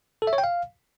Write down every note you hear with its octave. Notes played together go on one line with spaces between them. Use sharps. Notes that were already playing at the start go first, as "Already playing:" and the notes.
A4
E5
C#5
G5
F5